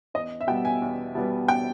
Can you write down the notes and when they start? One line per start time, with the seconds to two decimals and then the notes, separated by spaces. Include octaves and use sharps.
0.14 E2 D#5
0.41 E5
0.47 B2 G3 B3 G5
0.65 G#5
0.82 E2
1.15 B2 G3 B3
1.48 G5